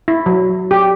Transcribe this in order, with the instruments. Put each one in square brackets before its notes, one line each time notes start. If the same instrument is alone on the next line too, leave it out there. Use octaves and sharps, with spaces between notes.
[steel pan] E4
F#3
G4